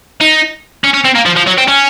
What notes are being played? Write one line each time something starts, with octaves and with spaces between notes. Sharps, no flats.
D#4
C#4
C#4
C4
A#3
F3
F3
F#3
C4
C#4